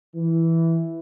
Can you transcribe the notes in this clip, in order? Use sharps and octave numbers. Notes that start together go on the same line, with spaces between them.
E3